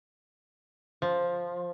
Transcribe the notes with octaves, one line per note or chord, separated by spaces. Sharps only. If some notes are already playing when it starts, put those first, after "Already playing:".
F3